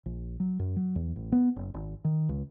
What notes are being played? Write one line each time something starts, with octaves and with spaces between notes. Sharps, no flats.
A#1
F#3
F#2
F#3
E2
A1
B3
F#1
G#1
D#3
C#2